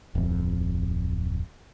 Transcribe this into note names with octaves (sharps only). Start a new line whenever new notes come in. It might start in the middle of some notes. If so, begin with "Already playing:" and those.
D1 F2